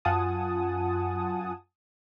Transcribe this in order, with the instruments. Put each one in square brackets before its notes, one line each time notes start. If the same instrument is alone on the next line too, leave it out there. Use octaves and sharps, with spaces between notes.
[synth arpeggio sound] F#2 F4 F#5 G#5 A5 D#6